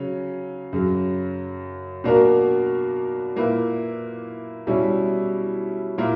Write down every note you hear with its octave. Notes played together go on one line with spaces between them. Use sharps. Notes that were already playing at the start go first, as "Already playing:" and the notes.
Already playing: C#3 F#3 C#4
F#2 C#3 F#3
B2 A#3 D4 F#4 A#4
A#2 A#3 E4 B4
B2 G3 C#4 E4
A#2 A#3 E4 A#4